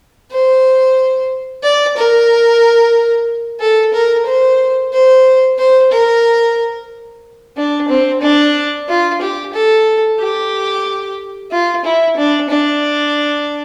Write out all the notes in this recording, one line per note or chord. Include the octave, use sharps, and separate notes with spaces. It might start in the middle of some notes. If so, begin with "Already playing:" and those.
C5
D5
A#4
A4
A#4
C5
C5
C5
A#4
D4
C4
D4
F4
G4
A4
G4
F4
E4
D4
D4